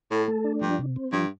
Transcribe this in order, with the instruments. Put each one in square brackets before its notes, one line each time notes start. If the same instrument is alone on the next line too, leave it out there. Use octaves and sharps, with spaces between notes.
[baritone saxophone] A2 [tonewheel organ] A4
[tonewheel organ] A3
D4
[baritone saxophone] G2 [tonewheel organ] F3
[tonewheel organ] C3
C4
[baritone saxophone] G2 [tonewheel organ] F3